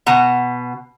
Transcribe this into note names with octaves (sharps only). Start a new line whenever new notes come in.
B2 F#5 A#5